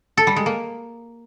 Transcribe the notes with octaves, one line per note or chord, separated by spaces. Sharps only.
A4
G3
G#3
A#3